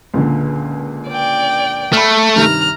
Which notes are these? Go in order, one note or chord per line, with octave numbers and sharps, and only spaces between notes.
C#2 A#2 D3
D5 G5
A3 B5 F6
G2 C3 D#3 A#5 F6